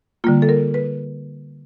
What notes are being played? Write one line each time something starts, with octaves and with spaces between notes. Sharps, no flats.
D3 G3 A#3 F4
A4
A#4
B4